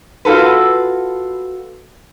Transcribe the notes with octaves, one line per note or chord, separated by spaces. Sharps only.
F4 F#4 A4 B4